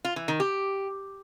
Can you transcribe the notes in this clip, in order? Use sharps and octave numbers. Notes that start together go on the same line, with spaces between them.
F4
E3
D#3
G4